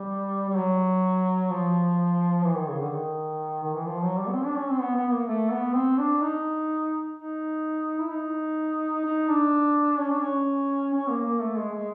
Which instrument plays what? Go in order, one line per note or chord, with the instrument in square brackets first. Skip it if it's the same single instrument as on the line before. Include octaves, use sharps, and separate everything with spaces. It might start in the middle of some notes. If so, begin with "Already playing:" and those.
Already playing: [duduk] G3
G3
F#3
F3
E3
D#3
C#3
D3
D#3
D#3
E3
F3
F#3
G3
B3
C4
D4
C#4
C4
B3
B3
A#3
A3
B3
C4
D4
D#4
D#4
E4
D#4
D#4
D4
C#4
D4
C#4
C#4
A#3
A#3
A3
G#3
G#3